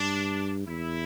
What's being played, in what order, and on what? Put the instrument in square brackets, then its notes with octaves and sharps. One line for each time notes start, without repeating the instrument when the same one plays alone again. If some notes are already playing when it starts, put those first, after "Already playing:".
Already playing: [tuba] G2 [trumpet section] D4
[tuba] E2 [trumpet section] E4